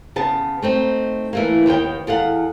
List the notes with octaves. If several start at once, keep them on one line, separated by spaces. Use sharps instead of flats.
C#3 B3 A5
A3 C4 D#4
E3 A3 A#3
D#2 D#3 B3 G5
E2 A4 F5 F#5